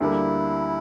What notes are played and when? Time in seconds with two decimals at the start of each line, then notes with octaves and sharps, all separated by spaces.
0.01 D2 D3 G3 A#3 E4